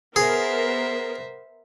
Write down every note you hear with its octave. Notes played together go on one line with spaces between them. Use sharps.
B3 G#4 A#4 C5 E5